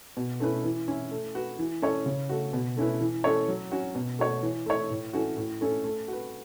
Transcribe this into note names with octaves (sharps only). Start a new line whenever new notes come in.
B2
A3 C#4 E4 B4
E3
C#4 E4
A3
F#4 B4
E3
C#4 A4 C#5
C#3
A3 F#4
B2
A3 C#4 E4 B4
E3
A3 C#4 A4 C#5
F#3
C#4 F#4
B2
A3 F#4 C#5
E3
A3 E4 C#5
A2
E3 A3 C#4 F#4
A2
A3 C#4 A4
A3
F#4 B4